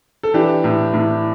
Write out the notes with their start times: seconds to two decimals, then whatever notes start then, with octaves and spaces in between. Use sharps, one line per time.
0.23 A4
0.34 E3 D4 G4
0.64 A2
0.94 A2